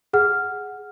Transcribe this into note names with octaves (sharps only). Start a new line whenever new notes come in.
G#4 F#5 F6